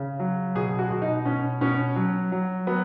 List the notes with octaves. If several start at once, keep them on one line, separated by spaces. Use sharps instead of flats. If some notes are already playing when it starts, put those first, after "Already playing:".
Already playing: C#3
F#3
B2 G#4
F#4
B2
D#4
B2 C#4
B2 C#4
F#3
F#3
F#3 B3